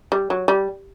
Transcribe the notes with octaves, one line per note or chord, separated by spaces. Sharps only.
G3
F#3
G3